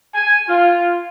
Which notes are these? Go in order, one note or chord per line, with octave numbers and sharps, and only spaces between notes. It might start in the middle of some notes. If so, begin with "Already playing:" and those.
G#5
F4